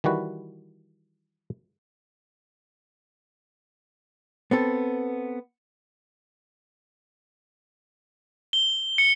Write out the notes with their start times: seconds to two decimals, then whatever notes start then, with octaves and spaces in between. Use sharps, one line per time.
0.04 D#3 E3 G3 F#4 B4
4.51 B3 C4 A4
8.53 G7
8.98 C#7